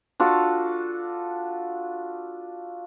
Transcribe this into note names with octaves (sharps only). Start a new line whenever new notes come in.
D4 F4 F#4 A4